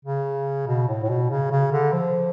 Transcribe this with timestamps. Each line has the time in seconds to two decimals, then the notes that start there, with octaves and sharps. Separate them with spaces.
0.05 C#3
0.67 B2
0.88 A2
1.03 A2
1.09 B2
1.31 C#3
1.51 C#3
1.72 D3
1.93 F3